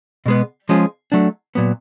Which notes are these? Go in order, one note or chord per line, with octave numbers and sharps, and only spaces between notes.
B2 G#3 B3
F3 G#3 C#4 F4 G#4
F#3 A3 D4
A#2 F#3 B3